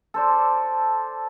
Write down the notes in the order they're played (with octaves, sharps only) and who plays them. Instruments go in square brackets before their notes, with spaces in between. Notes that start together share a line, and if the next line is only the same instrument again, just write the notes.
[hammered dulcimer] A4 C5 D5